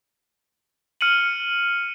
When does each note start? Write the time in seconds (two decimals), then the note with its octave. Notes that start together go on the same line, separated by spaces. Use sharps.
1.01 F6 C#7 D#7 F#7